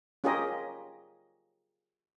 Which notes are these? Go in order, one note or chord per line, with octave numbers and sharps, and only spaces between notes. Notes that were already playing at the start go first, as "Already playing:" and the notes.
C#4 F4 G4 G#4 A#4 D#5